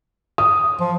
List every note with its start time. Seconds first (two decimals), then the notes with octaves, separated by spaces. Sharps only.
0.38 D#6
0.80 F3